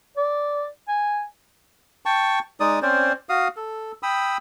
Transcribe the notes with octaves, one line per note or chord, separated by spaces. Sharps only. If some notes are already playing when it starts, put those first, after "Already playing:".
D5
G#5
G5 A5 C#6
G#3 D#4 D5 D#6
C4 C#4 C5 D5
F#4 F5 D#6
A4
G5 B5 D#6 E6